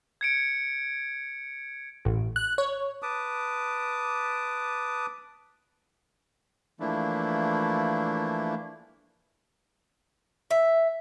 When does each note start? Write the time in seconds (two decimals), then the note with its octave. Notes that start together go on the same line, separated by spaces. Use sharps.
0.21 G#6 C#7 D7
2.05 A1
2.36 F#6
2.58 C#5
3.02 B4 A5 D6 D#6
6.80 E3 F3 A3 A#3 D4 E4
10.51 E5